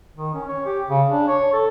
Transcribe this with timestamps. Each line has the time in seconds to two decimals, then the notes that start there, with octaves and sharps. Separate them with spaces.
0.16 D#3
0.34 C#4
0.48 C#5
0.66 G4
0.89 C#3
1.09 D4
1.28 C#5
1.53 A4